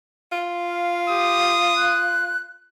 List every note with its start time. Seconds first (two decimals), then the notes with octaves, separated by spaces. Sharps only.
0.32 F4
0.68 F5
1.08 G4 D#6
1.77 F#6